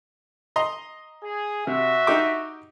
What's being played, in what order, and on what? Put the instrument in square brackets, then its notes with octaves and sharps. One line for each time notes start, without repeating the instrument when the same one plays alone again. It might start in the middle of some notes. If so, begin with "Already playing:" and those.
[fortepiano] D#5 A#5 C6
[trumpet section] G#4
[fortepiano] C3 [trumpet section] F#4 E5
[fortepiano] D#4 G4 D6